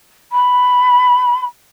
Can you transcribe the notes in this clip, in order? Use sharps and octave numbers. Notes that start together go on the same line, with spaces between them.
B5